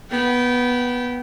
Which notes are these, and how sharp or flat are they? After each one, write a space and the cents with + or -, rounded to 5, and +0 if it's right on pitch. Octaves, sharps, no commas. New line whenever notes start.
B3 -10 G5 -25